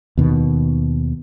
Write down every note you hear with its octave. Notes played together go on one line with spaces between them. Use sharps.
D#2 B2 D#3